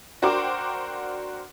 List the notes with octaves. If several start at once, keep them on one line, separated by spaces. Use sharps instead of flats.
D4 F#4 A#4 C5 G5 D6